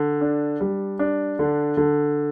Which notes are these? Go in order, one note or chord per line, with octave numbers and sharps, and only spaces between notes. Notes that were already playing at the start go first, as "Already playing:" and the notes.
Already playing: D3
D4
G3
D4
D3
D3